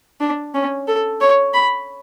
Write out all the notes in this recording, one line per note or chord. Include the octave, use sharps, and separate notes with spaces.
D4
C#4
A4
C#5
B5